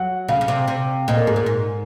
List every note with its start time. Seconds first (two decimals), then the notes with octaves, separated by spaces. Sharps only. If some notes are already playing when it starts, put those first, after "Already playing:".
Already playing: F#3 F#5
0.28 C#3 F5
0.41 C#3
0.48 C3
0.68 C3
1.08 A#2 D#5
1.17 A#4
1.27 G#2 G#4
1.36 A#2 A#4
1.46 G#2